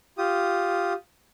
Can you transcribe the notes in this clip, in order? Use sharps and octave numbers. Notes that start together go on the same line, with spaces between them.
F4 G4 D#6